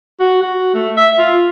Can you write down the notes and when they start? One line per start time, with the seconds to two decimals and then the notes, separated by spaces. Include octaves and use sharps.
0.20 F#4
0.42 F#4
0.74 A3
0.97 E5
1.18 F4